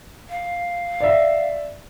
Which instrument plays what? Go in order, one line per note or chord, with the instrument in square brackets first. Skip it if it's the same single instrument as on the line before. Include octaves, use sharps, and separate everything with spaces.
[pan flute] F5
[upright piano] D5 E5